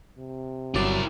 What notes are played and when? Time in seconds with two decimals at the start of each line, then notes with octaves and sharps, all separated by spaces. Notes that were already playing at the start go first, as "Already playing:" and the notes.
0.18 C3
0.75 G1 F#3 E4 A#4 D5